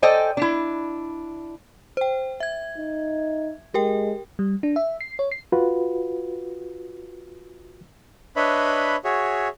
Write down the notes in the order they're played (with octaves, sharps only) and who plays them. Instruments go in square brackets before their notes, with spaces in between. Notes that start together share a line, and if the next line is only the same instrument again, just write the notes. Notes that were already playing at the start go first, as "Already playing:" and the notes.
[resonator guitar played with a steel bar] A4 C5 D5 D#5 G5 G#5
D4 E4
[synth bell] C5 G5
E5 G#6
[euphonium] D#4
[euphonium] G#3 [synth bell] G4 A#4 G5
[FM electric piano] G3
D4
E5
C7
C#5
C7
[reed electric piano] F4 F#4 B4
[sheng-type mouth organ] D4 B4 C#5 D#5 E5 B5
F#4 G#4 C#5 E5